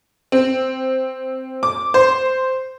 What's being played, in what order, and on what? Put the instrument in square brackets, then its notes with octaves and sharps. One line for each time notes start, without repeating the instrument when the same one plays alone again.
[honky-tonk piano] C4
D6
C5